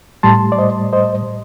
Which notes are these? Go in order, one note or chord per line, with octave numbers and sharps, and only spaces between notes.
A2 G3 A5 C6
D5
C5 D#5
C5 D#5